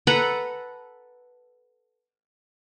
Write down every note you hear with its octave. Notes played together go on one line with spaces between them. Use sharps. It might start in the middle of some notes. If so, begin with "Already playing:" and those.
A4 B4 F#5 A#5